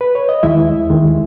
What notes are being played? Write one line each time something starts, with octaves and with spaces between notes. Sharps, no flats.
B4
C#5
D#5
D#2 D#3 G#3 E4 E5
D#2 D#3 G#3